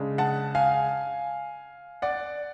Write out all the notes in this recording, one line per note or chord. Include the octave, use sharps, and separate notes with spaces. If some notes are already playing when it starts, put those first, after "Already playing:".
Already playing: C#3 G#3 D4
F#5 A5
F5 G#5
D5 F#5